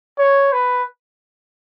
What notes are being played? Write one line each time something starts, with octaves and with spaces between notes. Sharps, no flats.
C#5
B4